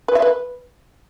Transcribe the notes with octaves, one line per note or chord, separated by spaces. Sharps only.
B4
E5
B4